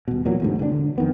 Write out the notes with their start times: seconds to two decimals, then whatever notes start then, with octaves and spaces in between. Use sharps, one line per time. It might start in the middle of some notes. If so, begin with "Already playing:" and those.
0.08 D#1 B2
0.25 E2 A#2 F#3
0.40 E1 D2 G#2
0.59 D2 C3 A#3 D4
0.72 D3
0.98 F2 D#3 B3